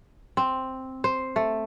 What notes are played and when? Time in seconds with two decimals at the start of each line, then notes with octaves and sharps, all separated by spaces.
0.37 C4
1.04 C5
1.36 A3